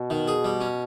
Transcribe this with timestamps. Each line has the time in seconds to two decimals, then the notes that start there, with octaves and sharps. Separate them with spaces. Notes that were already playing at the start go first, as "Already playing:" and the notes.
Already playing: B2
0.10 D#3
0.28 G#4
0.45 G3
0.60 C#4